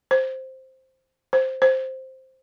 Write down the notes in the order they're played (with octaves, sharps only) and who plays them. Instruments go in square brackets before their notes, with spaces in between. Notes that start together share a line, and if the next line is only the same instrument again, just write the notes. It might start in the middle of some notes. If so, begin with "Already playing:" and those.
[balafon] C5
C5
C5